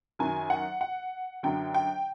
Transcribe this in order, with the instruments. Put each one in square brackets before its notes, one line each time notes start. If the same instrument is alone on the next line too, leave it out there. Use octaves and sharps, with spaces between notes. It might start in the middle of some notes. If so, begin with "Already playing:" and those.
[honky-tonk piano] F#2 D#3 F#3 G#5
F#5
F#5
F#2 D3 F#3 G5
G5